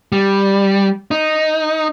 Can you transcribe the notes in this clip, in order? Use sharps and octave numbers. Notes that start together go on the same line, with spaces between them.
G3
D#4